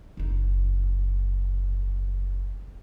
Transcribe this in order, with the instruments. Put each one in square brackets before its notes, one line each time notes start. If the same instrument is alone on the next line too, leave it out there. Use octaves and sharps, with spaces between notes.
[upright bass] F#1 D#4